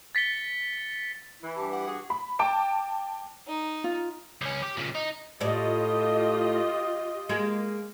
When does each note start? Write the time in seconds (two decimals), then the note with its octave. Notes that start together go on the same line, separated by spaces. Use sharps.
0.15 A6 B6 C#7 G7
1.42 E3 E4
1.56 G2 G4 A5
1.71 F#5
1.85 F#4 G#4
2.10 B5
2.39 G5 A5 D6 D7
3.48 D#4
3.84 F4
4.42 C#2 C#4
4.62 G4
4.77 A#2 C#3
4.95 D#4
5.41 A2 F4 G4 D5 D#5
7.29 G#3 A#3 G#4